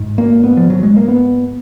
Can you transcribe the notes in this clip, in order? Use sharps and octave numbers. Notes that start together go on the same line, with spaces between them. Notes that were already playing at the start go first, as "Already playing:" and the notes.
Already playing: G#2
A#3
B3
F3
F#3
G#3
A#3
B3